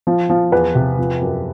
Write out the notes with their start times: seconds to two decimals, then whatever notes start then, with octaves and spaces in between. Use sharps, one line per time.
0.07 F3
0.30 F3
0.52 E2 B4
0.75 C3
0.98 F3
1.22 F#2